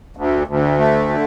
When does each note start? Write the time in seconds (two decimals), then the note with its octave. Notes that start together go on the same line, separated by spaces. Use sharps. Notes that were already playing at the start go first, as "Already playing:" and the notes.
0.17 D2
0.47 D2
0.78 A3
1.09 D3